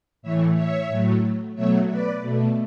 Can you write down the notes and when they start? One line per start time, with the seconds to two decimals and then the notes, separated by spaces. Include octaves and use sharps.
0.22 A2 E3 A3 C#5 E5
0.55 C#5 E5
0.89 A2 F#3 A3
1.55 B2 F#3 A3 C#5 E5
1.89 B4 D5
2.22 B2 A3